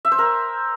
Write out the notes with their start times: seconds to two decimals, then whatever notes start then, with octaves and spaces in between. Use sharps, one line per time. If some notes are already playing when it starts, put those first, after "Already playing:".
0.05 E5
0.12 C5
0.19 A#4